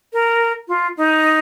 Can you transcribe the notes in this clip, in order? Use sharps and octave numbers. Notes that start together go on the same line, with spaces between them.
A#4
F4
D#4